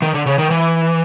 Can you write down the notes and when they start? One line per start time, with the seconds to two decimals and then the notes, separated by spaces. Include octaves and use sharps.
0.02 D#3
0.14 D3
0.26 C#3
0.38 D#3
0.50 E3